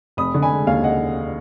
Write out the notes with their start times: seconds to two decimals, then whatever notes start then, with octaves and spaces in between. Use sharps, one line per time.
0.17 F1 B5 D#6
0.34 D3
0.42 G#5 B5
0.51 G#3
0.67 D#2 F5 G#5
0.84 D#5 F#5